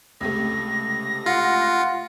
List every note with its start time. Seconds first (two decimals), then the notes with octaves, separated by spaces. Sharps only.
0.21 C#2 C3 A3 A#6
1.26 F4 F#5